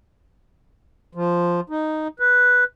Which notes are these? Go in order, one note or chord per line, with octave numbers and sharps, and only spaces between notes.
F3
D#4
B4